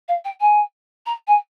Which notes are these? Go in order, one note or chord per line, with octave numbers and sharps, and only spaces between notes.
F5
G5
G#5
A#5
G#5